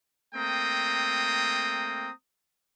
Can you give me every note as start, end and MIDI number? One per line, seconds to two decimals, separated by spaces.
0.35 2.10 57
0.35 2.10 58
0.35 2.10 60
0.35 2.10 79
0.35 2.10 82
0.35 2.10 87